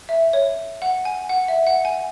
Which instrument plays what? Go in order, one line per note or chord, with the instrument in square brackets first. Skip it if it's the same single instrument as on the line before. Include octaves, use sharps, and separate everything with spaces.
[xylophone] E5
C#5
F#5
G#5
F#5
E5
F#5
G#5